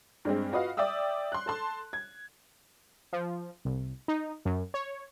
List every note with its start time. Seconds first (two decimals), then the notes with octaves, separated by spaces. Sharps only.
0.25 G2 G#3 C4
0.52 F4 F#4 B4 D#5 F5
0.77 D5 E5 G5 D#6 E6
1.32 C6 F#6
1.46 A4 A5 C6
1.93 G#6
3.13 F3
3.65 C2
4.08 D#4
4.45 F#2
4.74 C#5